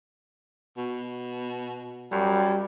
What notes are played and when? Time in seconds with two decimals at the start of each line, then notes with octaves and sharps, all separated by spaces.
0.77 B2
2.12 F#2 G3